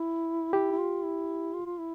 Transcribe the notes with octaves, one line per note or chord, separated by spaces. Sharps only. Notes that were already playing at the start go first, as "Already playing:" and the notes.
Already playing: E4
E4 G4
E4
F4
E4
F4
F4
E4